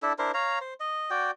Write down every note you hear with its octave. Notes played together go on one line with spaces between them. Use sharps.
D4 E4 A4
D4 E4 A#4 C5
C#5 F5 A#5
C5
D#5
F#4 D5 G5